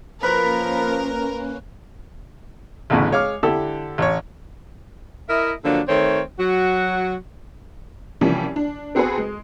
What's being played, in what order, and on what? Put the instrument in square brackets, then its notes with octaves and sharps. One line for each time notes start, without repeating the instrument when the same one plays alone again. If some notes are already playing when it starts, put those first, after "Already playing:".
[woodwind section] F3 [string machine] A#3 C#4 [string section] A#4 [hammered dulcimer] B4
[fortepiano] A1 D2 A2 C#3 B3
G#3 C#5 F5 D6 F6
D3 D4 E4 G4 A4
A1 C#5
[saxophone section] E4 A#4 D#5 E5
D3 F3 F#3 A#3 D4
D#3 A3 C4 C#5
F#3 F#4
[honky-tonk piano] C3 E3 F3 G3 A#3 C#4
D4
B3 C4 F#4 G#4 A4 B4
G#3